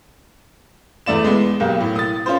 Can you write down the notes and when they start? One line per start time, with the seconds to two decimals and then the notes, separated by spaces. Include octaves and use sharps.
1.06 E2 A3 D5 E7
1.24 G#3 B3
1.60 B1 A#3 G4
1.81 A2
1.96 D#6 A6
2.26 C#4 F4 C5